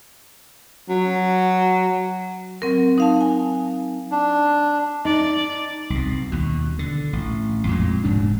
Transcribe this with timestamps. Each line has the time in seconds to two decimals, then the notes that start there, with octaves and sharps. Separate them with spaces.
0.89 F#3
2.62 F#3 C4 A#4
2.98 D#4 F5 A5
3.21 G#5
4.11 D4
5.05 D#4 D5
5.90 C2 B2
6.32 D#2 B2
6.79 D3
7.13 A1
7.67 F2 A#2 G#3
8.04 E1 G#2 C3 D4